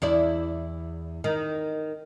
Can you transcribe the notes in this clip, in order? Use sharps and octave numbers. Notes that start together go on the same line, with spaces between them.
E2 E4 D5
D#3